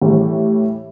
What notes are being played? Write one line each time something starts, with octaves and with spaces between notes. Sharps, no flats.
A2 E3 G3